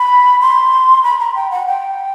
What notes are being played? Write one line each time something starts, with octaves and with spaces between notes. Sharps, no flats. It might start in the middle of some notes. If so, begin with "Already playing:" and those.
Already playing: B5
C6
B5
A#5
G5
F#5
G5